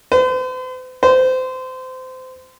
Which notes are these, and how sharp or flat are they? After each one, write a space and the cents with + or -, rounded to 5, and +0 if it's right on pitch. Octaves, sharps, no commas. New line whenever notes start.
C5 -45
C5 -25